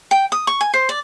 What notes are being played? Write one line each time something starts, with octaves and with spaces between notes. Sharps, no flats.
G5
D#6
C#6
G#5
C5
D5